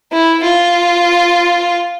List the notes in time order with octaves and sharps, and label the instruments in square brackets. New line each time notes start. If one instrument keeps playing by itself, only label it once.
[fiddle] E4
F4